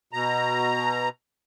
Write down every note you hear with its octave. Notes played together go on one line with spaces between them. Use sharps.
B2 A#5